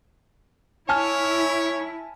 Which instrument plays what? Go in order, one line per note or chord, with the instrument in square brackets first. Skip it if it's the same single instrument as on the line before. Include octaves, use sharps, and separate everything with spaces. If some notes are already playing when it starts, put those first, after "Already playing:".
[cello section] E4 [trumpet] C#5 [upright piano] G#5 A5 F6